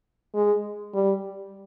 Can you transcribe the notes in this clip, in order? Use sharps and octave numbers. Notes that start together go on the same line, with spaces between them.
G#3
G3